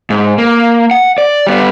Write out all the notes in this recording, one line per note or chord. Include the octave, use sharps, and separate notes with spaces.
G#2
A#3
F#5
D5
G3 B3